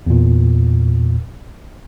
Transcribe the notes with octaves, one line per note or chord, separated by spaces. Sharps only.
E2 A#2